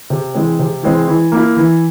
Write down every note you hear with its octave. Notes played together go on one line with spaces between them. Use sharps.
C3
E3 G#3 C4
C3
E3 G#3 C4
E3
A#3 E4
E3